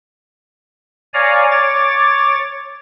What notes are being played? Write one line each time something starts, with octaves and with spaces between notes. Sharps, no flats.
C#5 D5 F5 G#5 A#5
C#5 D6 A6